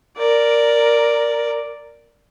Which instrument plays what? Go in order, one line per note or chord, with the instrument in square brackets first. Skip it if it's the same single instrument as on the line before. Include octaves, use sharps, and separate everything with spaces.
[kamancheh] A#4 D5